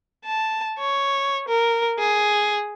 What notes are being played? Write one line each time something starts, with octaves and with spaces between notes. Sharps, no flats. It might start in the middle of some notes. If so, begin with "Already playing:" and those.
A5
C#5
A#4
G#4